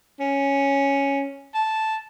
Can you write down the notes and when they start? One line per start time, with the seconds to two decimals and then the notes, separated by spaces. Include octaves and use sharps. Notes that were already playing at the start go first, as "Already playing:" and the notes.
0.20 C#4
1.55 A5